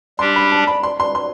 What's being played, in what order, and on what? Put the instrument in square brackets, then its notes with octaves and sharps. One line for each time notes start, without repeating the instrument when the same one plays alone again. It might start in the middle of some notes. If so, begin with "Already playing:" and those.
[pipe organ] G3 D4 G4 [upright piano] C6
[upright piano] B5
A5
B5
C6
C6
C6